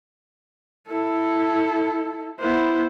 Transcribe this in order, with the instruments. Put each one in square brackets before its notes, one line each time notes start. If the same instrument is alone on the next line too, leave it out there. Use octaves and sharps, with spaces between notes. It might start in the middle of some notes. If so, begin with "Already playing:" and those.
[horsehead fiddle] E4 A4
[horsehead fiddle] B3 [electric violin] E4 C5